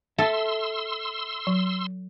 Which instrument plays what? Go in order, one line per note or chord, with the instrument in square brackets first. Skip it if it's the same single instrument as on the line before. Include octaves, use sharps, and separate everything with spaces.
[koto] A4 [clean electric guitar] E5 [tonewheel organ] C6 E6
[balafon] F#3